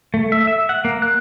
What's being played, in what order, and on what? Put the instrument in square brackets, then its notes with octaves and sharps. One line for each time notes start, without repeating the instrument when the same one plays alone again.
[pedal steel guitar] A3
E5
E5
F#5
A#3
F#6